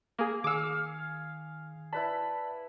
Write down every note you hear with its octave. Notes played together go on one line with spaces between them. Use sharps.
A#3 G#4
D#3 G#4 F5 D6 E6 C#7
E4 B4 D5 A5 B5